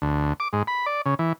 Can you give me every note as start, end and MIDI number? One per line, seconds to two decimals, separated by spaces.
0.02 0.33 38
0.40 0.48 86
0.53 0.63 44
0.67 0.86 83
0.86 1.01 74
1.06 1.15 49
1.19 1.33 52